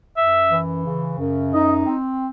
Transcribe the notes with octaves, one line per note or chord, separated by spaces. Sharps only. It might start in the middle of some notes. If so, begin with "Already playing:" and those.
F#2 E5
E3
C#3
F#2
D#4 D#5
C4